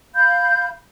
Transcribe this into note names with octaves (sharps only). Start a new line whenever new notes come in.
F5 B5 G6